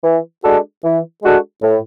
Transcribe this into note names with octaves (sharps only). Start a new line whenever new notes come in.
E3
G#3 D4 F#4 A4
E3
G#3 D4 F#4 A4
A2